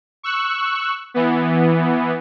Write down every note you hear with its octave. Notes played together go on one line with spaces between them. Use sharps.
C#6 E6 F#6
E3 B3